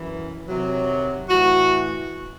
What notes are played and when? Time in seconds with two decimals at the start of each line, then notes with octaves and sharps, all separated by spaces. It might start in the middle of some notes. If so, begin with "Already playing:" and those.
Already playing: F#2 E3
0.48 C3 D#3 F#3
1.29 A2 E3 F#4